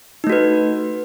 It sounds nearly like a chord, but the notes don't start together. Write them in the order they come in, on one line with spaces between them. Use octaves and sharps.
D#4 A3 F#4 B4